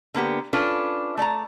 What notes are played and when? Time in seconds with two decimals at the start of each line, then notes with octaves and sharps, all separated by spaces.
0.14 D3 A#3 B3 G4
0.53 C#4 D4 F4 A4 B4
1.17 A3 D5 A5 A#5